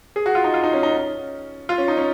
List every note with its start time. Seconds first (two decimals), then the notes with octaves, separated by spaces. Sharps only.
0.16 G#4
0.26 F#4
0.35 F4
0.44 D#4
0.54 F4
0.64 D#4
0.73 C#4
0.83 D#4
0.92 C#4
1.69 F4
1.78 C#4
1.88 D#4
1.97 C#4